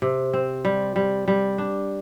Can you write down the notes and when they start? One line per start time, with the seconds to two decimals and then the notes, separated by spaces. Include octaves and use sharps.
0.02 C3
0.33 C4
0.65 G3
0.96 G3
1.28 G3
1.58 D4